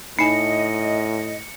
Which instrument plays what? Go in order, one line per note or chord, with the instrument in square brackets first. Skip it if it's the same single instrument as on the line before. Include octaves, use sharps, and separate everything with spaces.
[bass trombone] A2 [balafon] D#4 G#5 [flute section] D#5 [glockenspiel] C#7